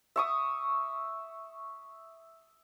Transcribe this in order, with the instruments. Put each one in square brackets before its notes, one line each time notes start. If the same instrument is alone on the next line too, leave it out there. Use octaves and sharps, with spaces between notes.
[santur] E5 C#6 D#6